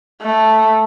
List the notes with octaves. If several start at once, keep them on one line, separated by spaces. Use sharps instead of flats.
A3